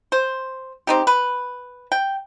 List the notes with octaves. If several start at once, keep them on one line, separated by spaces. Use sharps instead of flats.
C5
C4 D#4 G4
B4
G5